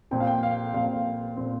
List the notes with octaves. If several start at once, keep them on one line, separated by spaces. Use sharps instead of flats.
A#2 F3 C4 G5
F5
G5
F5
A#2 F3 C4 F5
A#2 F3 C4